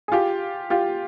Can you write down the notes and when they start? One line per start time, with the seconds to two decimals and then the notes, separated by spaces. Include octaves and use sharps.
0.08 G#4
0.12 F4 G4
0.70 F4 G4